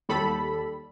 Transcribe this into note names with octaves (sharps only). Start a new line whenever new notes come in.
D#2 G3 A4 B5